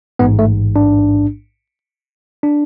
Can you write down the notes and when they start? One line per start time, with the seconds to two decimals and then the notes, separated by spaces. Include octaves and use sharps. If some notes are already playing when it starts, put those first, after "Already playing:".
0.19 A1 G#2 B3
0.39 A3
0.76 D4
2.43 D4